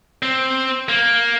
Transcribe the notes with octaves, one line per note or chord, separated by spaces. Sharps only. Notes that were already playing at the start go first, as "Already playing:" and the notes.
C4
A#3